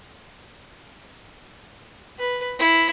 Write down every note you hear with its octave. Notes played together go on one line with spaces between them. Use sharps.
B4
E4